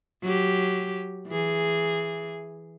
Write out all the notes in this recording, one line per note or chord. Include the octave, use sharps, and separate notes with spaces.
F#3 G4
E3 G#4